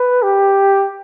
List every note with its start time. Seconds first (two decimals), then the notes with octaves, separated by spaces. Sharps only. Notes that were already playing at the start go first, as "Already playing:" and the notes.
Already playing: B4
0.23 G4